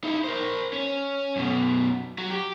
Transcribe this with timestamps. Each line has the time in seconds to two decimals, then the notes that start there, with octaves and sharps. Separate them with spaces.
0.04 D#4 E4
0.24 A#4 C5
0.73 C#4
1.36 F#2 B2
2.18 F#3
2.30 G4